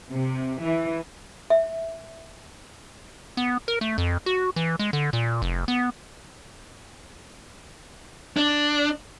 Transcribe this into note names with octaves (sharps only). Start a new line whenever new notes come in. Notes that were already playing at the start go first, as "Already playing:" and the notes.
C3
E3
E5
B3
A#4
A3
F2
F#4
E3
G#3
D3
A#2
F1
B3
D4